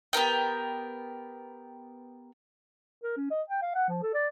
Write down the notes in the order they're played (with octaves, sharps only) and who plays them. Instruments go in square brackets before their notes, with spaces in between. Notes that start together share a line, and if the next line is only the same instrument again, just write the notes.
[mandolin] B3 G4 A#4 G5
[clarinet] A#4
C#4
D#5
G5
F5
F#5
F3
A4
D5